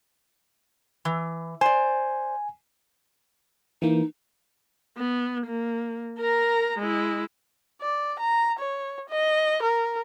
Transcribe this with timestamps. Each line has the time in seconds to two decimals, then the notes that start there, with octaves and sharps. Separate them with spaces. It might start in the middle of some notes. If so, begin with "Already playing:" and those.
1.05 E3
1.61 C5 D5 G#5
3.82 E3 A#3 D#4
4.98 B3
5.47 A#3
6.19 A#4 A#5
6.79 G#3 E4
7.81 D5
8.19 A#5
8.59 C#5
9.09 D#5
9.63 A#4